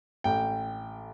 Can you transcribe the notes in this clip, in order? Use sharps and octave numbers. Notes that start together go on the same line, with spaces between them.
A1 G5